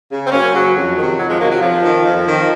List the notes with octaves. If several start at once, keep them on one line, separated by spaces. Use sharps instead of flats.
C#3
C4
F#2 A#3 C#4
C#3 F#3
F2 F#3
C3 D#3
F2 F#3
F3 G#3
C3 D#3 F#3 A#3
F#3
F2 F3
D#3
F2
D#3